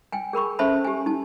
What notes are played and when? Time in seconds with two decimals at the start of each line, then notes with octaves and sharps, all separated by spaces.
0.12 G5 G#5
0.33 G#4 A#4 B5 C#6
0.59 C#4 A4 C5 E5 A5 B5
0.84 G4 G#5
1.06 D#4 A5